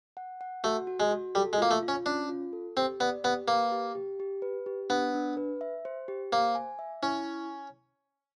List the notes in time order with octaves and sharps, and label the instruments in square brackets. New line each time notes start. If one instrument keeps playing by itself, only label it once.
[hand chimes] F#5
F#5
[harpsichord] A3 [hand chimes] F#4
[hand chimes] F#4
[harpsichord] G#3
[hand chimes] F#4
[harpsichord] G3 [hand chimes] A4
[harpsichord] G#3
[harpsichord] A#3 [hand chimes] F4
[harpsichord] A3
[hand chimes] F4
[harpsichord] C#4
[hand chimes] C#4 [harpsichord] D4
[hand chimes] F4
A4
[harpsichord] C4 [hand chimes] G4
[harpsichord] B3 [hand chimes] D5
[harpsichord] B3 [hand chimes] G4
[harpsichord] A#3 [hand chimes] B4
[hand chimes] G4
G4
G4
B4
G4
[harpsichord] B3 [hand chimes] D4
[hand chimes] D4
B4
E5
C5
G4
[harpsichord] A#3 [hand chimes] C5
[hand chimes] G#5
E5
[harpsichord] C#4 [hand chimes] E4